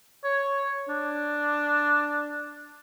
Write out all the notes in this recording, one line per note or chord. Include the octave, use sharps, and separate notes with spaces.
C#5
D4